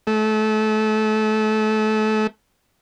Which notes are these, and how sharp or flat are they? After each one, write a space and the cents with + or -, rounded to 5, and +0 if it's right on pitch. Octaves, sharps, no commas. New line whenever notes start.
A3 -25